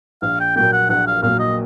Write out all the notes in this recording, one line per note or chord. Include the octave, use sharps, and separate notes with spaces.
A#1 F5
G5
A#2 F#3 A#3 G5
F#5
A#1 F#5
F5
A#2 F#3 A#3 F5
D#5